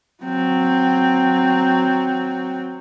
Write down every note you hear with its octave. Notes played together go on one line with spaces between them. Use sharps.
F#3 C4